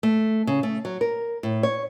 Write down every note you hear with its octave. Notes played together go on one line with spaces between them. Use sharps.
A3
C#3
A3
F#3
A#4
A2
C#5